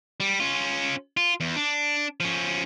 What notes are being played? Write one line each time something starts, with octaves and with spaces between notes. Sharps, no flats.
G3
C#4 F4
F4
E2
D4
F3 C#4